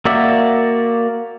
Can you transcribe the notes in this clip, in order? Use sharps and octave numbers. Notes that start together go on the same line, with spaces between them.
A#3 F#4 D5 E5